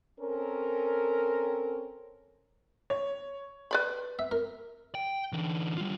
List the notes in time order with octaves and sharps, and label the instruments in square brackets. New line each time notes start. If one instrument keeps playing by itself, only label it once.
[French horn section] C4 C#4 A4 A#4
[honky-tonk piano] C#5
[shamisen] B4 D5 B5
[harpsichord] E5
A#4
[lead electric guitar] G5
D3 E3
G3 F4